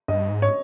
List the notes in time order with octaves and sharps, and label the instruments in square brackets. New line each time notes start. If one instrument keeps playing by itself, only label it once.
[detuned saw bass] G2 [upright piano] D#5
[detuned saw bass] G#2
[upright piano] C#5